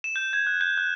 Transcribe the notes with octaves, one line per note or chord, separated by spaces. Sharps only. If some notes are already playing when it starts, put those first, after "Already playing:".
E7
G6
G#6
F#6
G6
F#6